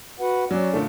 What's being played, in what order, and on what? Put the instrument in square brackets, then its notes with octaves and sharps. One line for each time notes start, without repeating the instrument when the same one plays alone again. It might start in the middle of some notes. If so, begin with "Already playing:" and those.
[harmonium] F#4 B4 F#5
[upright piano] F#3 [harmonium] C#4 D5
[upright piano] A#2 D3 A3